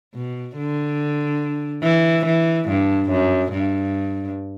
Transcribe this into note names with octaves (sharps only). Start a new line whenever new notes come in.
B2
D3
E3
E3
G2
F#2
G2